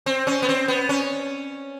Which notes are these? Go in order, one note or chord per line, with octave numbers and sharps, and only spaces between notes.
C4
C#4
B3
C4
B3
C#4